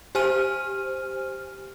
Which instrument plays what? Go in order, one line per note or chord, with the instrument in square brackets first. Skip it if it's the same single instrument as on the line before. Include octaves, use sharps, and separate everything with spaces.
[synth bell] G4 C5 G#5 F6 D#7